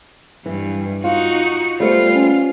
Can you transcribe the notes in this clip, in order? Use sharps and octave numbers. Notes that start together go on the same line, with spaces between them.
G2 E3
D#4 F4 F#4
G3 A3 B3 F4 C5
C#4